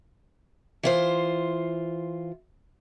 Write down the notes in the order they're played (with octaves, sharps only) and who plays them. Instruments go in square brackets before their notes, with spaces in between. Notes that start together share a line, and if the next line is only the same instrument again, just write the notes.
[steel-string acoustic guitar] E3 F4 C5